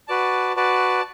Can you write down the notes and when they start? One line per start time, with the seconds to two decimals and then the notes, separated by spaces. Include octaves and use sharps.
0.08 F#4 B4 D5 A5
0.56 F#4 B4 D5 A5